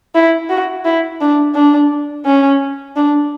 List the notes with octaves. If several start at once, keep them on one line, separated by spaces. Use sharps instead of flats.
E4
F#4
E4
D4
D4
C#4
D4